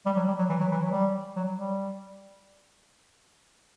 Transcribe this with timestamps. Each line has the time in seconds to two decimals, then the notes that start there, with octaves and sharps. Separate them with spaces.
0.06 G3
0.16 F#3
0.28 G3
0.38 F#3
0.49 E3
0.60 F#3
0.71 E3
0.82 F#3
0.92 G3
1.36 F#3
1.57 G3